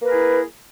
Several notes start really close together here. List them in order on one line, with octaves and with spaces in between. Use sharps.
A#3 B4 A#4 G#4 E4